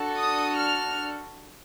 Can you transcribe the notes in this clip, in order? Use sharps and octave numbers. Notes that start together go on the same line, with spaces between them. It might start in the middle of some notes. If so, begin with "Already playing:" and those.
Already playing: D4 F#4 A4
D#6
F6